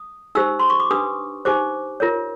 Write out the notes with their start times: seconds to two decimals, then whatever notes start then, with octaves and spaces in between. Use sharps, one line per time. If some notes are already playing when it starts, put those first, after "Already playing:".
Already playing: D#6
0.35 D#4 G4 C5 E6
0.59 C6
0.70 C#6
0.80 D6
0.91 D4 G4 B4 D#6
1.45 D#4 G4 C5 D6
2.00 F4 A#4 C#5